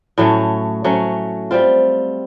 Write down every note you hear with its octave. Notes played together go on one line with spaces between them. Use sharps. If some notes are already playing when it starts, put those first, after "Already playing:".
A2 F#3 A3 C#4
F#3 A3 C#4
G3 C4 F4